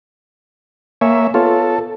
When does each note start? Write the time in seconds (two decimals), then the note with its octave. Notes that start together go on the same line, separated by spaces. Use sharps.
1.01 A#3 C#5 E5 G#5 C#6
1.34 B3 F4 A4 C#5